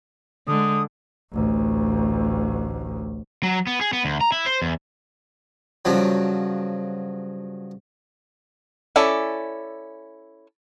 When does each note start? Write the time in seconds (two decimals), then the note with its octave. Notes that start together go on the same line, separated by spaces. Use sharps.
0.48 D3 G#3 D#6
1.32 A1 D2
3.43 F#3
3.67 B3
3.81 G#4
3.93 B3
4.05 D2
4.21 A#5
4.32 E4
4.46 C5
4.62 E2
5.85 G2 C#3 F3 F#3
8.96 C#4 E4 A4 D5